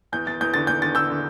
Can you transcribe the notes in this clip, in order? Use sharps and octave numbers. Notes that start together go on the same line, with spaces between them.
E2 G6
E2 A6
E2 G6
D3 A6
E2 G6
D3 A6
D3 E6 G6
D3